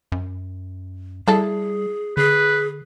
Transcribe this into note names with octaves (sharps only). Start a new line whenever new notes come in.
F#2
G3 E4 G#4 A4
D3 G#4 B4